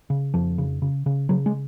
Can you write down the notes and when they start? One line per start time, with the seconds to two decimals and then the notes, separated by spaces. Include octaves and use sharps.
0.10 C#3
0.34 F2 F3
0.58 C#3
0.82 C#3
1.06 C#3
1.29 C#3 F#3
1.46 G#3